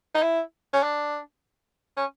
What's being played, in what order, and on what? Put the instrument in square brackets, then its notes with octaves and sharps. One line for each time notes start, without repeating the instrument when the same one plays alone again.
[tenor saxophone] D#4
E4
C#4
D4
C#4